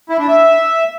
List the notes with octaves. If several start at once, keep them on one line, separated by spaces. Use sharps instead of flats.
E4
D4
E5